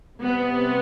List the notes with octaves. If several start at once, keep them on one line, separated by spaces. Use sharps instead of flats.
C3 G3 B3